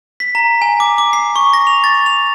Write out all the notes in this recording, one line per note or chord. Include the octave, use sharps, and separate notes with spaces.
B6
A#5
G#5
D6
D6
C7
C#6
A#6
F7
A6
F7